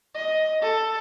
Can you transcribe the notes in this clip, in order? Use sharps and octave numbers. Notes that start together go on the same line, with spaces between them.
D#5
A4